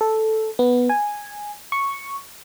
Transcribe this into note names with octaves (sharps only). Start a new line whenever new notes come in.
A4
B3
G#5
C#6